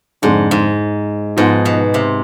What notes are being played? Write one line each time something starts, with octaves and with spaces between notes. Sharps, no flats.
F2 G#2 D3 G#3 D4
G#2
G#2 F3 B3 D#4
B2
C3